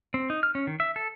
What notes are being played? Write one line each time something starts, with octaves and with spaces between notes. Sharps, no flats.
C4
D#4
F6
C#4
D#3
E5
A4